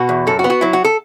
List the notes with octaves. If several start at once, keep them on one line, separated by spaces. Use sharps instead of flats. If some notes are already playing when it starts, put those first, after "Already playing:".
Already playing: B2 F#4
E2
F#2 A4
F#4
B3
F#4
F#3 E4
F#4
A4